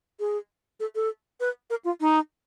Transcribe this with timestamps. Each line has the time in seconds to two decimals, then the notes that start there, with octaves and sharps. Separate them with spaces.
0.20 G#4
0.80 A4
0.95 A4
1.40 B4
1.70 A#4
1.85 F4
2.01 D#4